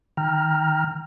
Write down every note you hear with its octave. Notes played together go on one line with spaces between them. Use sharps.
D#3 G5 A#5 F6